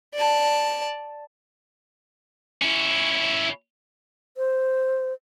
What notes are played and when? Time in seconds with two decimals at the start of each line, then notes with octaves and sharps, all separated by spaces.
0.15 D5 A5
2.62 C#4 E4
4.37 C5